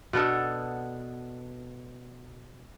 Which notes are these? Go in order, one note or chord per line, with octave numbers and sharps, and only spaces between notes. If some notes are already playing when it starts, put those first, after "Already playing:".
B2 B3 D4 A4